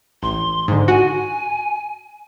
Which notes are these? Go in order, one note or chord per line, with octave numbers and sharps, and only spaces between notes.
A1 C6
G#2 D3
F#4 G#5